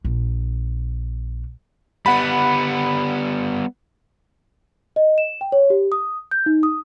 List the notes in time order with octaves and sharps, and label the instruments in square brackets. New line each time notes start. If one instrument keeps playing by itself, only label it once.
[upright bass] A#1
[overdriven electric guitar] G3 B3 [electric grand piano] F#5 B5
[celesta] D#5
E7
G5
C#5
G4
D#6
G6
D#4
D#6